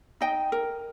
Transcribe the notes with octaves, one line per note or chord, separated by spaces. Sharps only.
D#4 D#5 G5
A#4